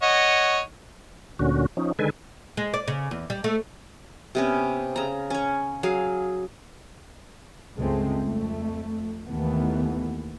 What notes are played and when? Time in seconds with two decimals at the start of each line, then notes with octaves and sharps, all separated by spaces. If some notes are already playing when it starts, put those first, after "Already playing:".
0.02 C#5 D#5 F#5
1.39 D2 A#2 D3 C#4 F#4
1.77 F3 C#4 D#4
1.99 D3 D#3 G#3 A4 B4 G#5
2.57 G#3
2.74 D5
2.88 C#3
3.11 E2
3.30 G3
3.44 A3
4.35 C3 B3 C#4
4.96 C#3 A#5
5.30 C#4 C#5
5.83 F#3 G#4 F5
7.78 C#2 G2 G#3 A3 C4
8.21 F2 A3
9.26 D#2 D#3 E3 A3 B3